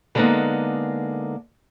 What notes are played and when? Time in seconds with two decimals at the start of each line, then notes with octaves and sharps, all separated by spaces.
0.15 D3 G3 G#3 A#3 B3 D#4